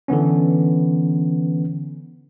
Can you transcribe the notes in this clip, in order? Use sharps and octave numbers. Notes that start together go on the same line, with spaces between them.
D3 E3 B3 C#4